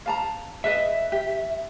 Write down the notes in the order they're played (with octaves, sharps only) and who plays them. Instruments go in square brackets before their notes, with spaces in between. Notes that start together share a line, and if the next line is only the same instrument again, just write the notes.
[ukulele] F5 A5 A#5
[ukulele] G#4 B4 D#5 [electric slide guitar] E5
[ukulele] G4